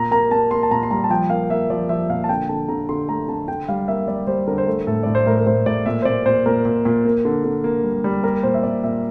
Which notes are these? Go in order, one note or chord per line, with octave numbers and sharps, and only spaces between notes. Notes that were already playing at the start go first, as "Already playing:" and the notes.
Already playing: A#2 A#5
A#3 A#5
A#3 A5
A#3 C6
A5
A#2 A#5
C6
G3 A#5
A5
F3 G5
A#3 F5
A#3 E5
F3 D5
F3 E5
A#2 F5
A5
D3 G5
D3 A5
D3 A#5
D3 C6
A3 A#5
D3 A5
D3 G5
G3 F5
A#3 E5
G3 D5
G3 C5
D3 A#4
C5
A3 A#4
A2 A4
A2 D5
C5
A2 A#4
A#4
A2 C5
A2 D5
A#2 E5
C5
A#2 D5
A#2 C5
A#2 A#4
A#2
A#2
A#3
D3
D3
A#3
G3
G3
A#3 A#4
A#2 C5
E5
A#2 D5
A#2 E5